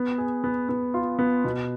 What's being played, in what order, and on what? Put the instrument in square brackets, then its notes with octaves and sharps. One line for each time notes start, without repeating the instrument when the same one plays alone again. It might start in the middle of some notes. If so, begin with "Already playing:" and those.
Already playing: [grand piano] B3
G#4
B3
B3
F4
B3
B2